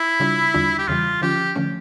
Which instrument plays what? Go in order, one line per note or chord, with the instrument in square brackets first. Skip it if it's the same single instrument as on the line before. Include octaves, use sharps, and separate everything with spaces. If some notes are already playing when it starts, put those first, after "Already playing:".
Already playing: [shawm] E4
[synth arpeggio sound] C#3 G3 D4 F4
E2 D3 G3 D4 F4
[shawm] G4
[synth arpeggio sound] E2 C#3 E3 G3 [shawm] F4
[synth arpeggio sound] D3 F3 C#4 F4 [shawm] G4
[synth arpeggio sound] D3 F3 A3 C#4